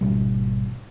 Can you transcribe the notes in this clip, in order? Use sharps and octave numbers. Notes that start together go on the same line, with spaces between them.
G#1 B2 G3